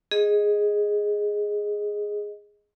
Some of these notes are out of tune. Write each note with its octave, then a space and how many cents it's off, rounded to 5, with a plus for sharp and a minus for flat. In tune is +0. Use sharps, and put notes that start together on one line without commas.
G#4 +0 D#5 +0